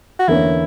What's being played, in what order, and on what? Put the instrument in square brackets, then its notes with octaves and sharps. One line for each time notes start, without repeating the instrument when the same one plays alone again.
[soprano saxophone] F#4
[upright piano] E2 D3 A#3 C#4 [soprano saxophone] E4